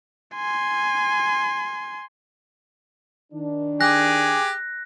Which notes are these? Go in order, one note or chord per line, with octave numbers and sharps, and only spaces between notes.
G#5 C6
D#3 D4
G4 G#4 F#6 A#6